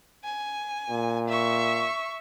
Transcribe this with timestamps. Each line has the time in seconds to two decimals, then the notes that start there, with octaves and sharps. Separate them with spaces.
0.24 G#5
0.89 A#2
1.28 E5 C#6